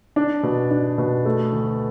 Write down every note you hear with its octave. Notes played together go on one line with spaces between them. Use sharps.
D4
B2
D4
B2
A3
D2